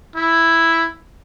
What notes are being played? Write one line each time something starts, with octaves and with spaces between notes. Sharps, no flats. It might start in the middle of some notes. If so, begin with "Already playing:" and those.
E4